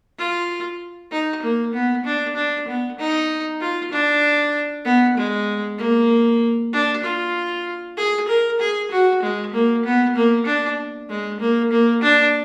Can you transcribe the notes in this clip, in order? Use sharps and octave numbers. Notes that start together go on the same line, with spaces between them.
F4
D#4
A#3
B3
D4
D4
B3
D#4
F4
D4
B3
G#3
A#3
D4
F4
G#4
A#4
G#4
F#4
G#3
A#3
B3
A#3
D4
G#3
A#3
A#3
D4